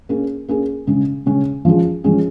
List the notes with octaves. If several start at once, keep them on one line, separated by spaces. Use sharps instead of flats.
A#3 C#4 G#4
A#3 C#4 G#4
C#3 G#3 C#4
C#3 G#3 C#4
F3 G#3 C#4 G#4
F3 G#3 C#4 G#4